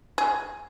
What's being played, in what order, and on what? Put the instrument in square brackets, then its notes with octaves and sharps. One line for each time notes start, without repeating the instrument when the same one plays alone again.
[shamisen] G#4